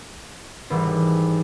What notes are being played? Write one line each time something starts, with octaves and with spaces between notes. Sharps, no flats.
G#1 E3 G3